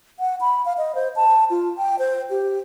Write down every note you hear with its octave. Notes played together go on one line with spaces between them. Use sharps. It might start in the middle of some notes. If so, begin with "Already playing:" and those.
F#5
B5
F5
D#5
C5
A5
F4
G5
C5
G4